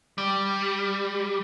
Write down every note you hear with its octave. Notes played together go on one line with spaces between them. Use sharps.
G3